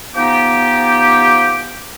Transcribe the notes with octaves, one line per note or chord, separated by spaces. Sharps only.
F3 B3 D#4 G4